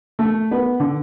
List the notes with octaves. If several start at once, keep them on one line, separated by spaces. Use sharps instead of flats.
A3
B3
D3